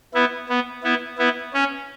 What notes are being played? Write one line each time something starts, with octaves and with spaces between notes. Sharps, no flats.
B3 E4
B3
B3 E4
B3 E4
C#4